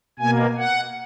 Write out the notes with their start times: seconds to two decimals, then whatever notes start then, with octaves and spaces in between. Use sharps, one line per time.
0.19 B2 A#3 G#5
0.58 F#5